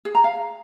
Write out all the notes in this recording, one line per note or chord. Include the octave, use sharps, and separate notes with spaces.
G#4
A#5
F5